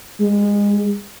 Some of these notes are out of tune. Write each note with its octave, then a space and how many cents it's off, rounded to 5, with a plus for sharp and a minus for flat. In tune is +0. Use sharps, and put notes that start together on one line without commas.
G#3 -25